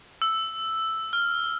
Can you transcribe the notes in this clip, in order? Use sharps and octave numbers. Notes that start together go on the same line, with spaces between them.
E6
F6